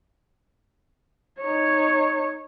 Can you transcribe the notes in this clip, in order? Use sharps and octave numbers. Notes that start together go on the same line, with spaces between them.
D#4 C#5